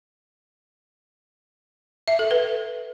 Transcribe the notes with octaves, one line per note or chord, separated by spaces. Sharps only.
E5
A4
B4